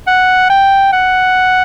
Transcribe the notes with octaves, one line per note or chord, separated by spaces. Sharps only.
F#5
G5
F#5